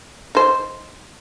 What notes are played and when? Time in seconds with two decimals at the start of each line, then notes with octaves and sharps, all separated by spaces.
0.35 D#4 C5